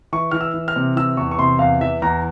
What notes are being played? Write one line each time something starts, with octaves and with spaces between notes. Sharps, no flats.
E3 C#6
E3 F6
E6
E3
F6
C3
E3 E6
E2 C#6
C#6
C3 C6
E2 F5
E3 E5
E2 A#5